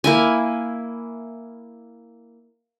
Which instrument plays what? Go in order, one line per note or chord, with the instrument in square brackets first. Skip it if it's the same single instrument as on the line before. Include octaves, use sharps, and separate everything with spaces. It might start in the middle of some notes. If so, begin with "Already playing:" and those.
[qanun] A#3 E4 G#5